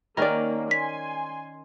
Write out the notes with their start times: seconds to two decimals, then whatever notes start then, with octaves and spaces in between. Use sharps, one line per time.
0.17 D#3 A#3 C#4 A#4 D5
0.71 G#5 C6 B6